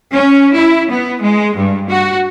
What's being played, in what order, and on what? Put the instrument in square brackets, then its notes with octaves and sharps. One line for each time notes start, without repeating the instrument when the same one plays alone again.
[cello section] C#4
E4
B3
G#3
G2
F#4